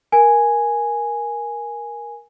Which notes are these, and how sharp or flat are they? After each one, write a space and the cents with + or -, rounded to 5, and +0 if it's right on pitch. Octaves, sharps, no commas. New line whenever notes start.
A#4 +15 G#5 +0